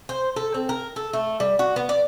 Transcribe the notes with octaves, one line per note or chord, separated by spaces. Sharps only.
C5
A4
C4
A#4
A4
A3
G3
F#4
B3
D5